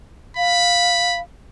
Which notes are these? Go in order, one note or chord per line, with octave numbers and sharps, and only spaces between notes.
F5 B5